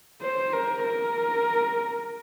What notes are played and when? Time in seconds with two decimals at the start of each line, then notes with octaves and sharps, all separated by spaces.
0.21 C5
0.53 A#4
0.84 A#4